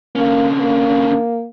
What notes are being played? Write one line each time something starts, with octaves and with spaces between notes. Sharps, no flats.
D3 A#3 C#4
A#3